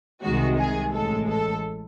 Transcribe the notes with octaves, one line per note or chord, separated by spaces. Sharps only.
C2 C3 D#3 G#3 F#4
G#4
A1 A2 G#3 A4
A4